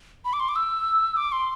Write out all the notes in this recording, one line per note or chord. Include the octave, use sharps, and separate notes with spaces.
B5
D6
C6
D6
E6
D6
C6